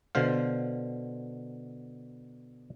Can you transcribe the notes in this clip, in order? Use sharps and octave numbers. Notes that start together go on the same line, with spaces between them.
B2 D3 C5 F5